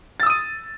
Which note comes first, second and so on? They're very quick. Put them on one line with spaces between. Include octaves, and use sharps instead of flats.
A6 E6 D#6 D#7